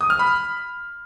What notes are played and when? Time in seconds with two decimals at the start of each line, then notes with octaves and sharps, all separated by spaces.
0.01 D#6
0.10 F6
0.19 B5